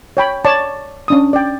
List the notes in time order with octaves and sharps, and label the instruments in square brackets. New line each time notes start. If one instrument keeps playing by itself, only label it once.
[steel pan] C#5 G5 B5
C#5 D5 A5 C#6
C#4 D4 D#6
D5 G5